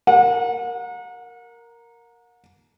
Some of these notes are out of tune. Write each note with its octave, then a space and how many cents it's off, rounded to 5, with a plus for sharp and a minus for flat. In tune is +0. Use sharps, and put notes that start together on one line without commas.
A#4 +0 F#5 -40